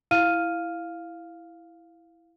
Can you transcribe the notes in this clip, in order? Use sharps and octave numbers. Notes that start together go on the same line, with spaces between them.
E4 F5 F6 D#7